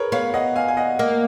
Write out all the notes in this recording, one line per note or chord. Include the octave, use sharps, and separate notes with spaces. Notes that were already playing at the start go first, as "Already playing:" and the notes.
Already playing: G#4 A#4 B4 C#5
B3 C#5 F5
D#5 F#5
F5 G#5
G#5
D#5 F#5
A#3 D#5 F#5